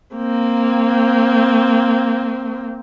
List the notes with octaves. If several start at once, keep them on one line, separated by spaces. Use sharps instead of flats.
A#3 C4